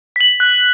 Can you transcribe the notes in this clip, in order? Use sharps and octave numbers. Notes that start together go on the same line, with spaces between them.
B6 F#7
F#6